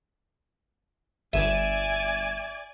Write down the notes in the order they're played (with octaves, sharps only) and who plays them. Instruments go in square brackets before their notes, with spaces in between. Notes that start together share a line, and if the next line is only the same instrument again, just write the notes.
[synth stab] G1 D#7 E7 [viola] D5 G#5 [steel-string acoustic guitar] E5